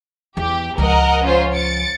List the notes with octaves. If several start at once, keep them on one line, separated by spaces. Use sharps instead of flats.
E2 G4
C#2 F3 A#4 D#5 F#5
C#4 F4 C5
A6 C#7 D7